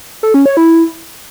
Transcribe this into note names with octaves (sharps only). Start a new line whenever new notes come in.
A4
C#4
C#5
E4